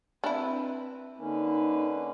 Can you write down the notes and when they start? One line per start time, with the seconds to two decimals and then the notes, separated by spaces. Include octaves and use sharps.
0.24 C4 D4 E4 B4
1.18 D3 A#3 C#4 D#4 B4